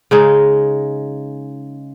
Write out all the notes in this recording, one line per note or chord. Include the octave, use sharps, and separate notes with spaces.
C#3 G#3 D#4